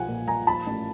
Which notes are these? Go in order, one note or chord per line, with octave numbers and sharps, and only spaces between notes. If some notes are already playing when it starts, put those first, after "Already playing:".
Already playing: B1 F3 F#5 G#5
A#2
A#2 G#5 A#5
F3 A5 B5
A1